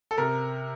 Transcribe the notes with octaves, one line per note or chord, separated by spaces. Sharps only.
A4
C3 A#4